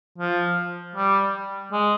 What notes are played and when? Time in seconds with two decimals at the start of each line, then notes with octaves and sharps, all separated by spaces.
0.18 F3
0.95 G3
1.72 G#3